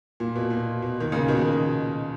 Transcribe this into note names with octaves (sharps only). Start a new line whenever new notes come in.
A#2
B2
A#2
B2
D#3
A#2 C#3
B2 D#3